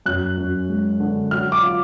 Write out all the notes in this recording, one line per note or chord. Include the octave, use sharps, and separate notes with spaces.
F#2 F#6
F#2
G#3
D3
F#3 F6
D6
F4